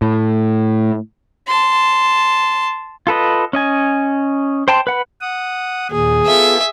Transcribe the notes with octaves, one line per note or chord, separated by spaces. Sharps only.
A2
A5 C6
F4 A4 B4 D#5
C#4 D#5 G#5
C5 G5 A5 C6
B4 F#5 B5
F#5 D#6
D#2 A#2 G#4
B3 F4 A4 E5